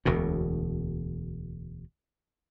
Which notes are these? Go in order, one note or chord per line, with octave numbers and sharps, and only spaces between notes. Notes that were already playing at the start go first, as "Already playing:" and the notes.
E1 D2 B2